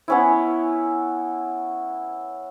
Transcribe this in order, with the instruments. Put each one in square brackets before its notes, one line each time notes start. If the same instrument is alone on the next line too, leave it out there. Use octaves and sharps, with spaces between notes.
[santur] B3 C#4 E4